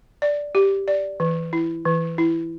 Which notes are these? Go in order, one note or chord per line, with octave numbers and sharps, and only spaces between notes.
D5
G4
D5
E3
E4
E3
E4